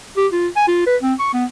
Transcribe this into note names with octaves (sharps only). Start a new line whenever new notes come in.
G4
F4
G#5
F4
B4
C4
C#6
B3